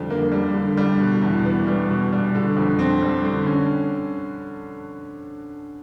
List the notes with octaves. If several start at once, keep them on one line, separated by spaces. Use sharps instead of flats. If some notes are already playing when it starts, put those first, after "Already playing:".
Already playing: F2 D3 G3
A#3
G3
D3
G3
B2
E2
B3
G3
B2
G3
D3
F2
C4
G3
D3
C#4